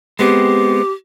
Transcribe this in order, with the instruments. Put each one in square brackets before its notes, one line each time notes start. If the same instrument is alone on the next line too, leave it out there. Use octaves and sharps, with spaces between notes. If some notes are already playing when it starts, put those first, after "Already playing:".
[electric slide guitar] G#3 B3 C4 [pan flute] G4